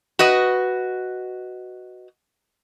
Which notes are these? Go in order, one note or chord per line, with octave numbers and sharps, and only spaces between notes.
F#4 B4 D#5